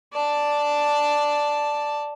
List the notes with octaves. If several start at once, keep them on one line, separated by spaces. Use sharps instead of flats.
D5 A5